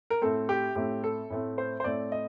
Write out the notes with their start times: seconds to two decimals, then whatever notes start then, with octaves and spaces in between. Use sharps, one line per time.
0.10 A#4
0.22 A2 A3 C4 A4
0.49 G4
0.76 A2 A3 C4 G4
1.04 A4
1.30 A2 A3 C4
1.58 C5
1.80 C5
1.84 A2 A3 C4 D5
2.12 D#5